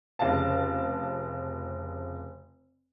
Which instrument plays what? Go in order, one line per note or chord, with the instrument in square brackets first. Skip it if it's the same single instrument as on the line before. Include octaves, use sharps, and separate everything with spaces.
[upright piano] F1 C#3 F5 A5